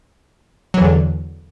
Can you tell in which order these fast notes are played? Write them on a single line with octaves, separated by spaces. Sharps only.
F#3 E3 E2 D3